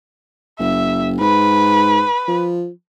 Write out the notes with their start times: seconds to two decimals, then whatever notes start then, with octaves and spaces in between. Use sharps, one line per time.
0.59 F#1 E5
1.20 G#2 B4
2.28 F3